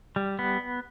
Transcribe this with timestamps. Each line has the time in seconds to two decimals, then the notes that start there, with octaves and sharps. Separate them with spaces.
0.16 G3
0.39 B3